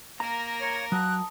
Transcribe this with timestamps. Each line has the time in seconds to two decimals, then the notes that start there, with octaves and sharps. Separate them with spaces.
0.20 A#3 A#4 A#5 A#6
0.60 C#5
0.92 F#3 A5 D#6 F#6